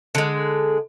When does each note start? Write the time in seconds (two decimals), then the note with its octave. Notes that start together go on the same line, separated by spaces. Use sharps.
0.15 D3 G#3